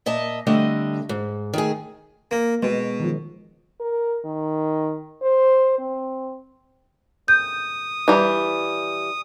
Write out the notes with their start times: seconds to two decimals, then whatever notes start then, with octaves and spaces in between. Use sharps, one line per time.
0.06 A#2 D#5 E5 A5
0.47 D3 G3 A3 C4 D#5
1.09 G#2
1.54 D#3 A3 G#4
2.31 A#3
2.63 B2 G#3
3.00 D#3 F3
3.80 A#4
4.25 D#3
5.22 C5
5.79 C4
7.28 D#6 G6
8.08 E3 G3